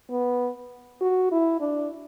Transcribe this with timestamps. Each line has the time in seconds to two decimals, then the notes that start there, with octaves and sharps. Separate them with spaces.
0.10 B3
1.01 F#4
1.32 E4
1.61 D4